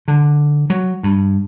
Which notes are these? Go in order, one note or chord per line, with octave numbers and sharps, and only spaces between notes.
D3
F#3
G2